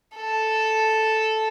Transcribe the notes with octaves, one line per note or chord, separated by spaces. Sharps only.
A4